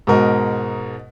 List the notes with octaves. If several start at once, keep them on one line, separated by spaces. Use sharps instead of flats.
G#2 B2 A#4 D#5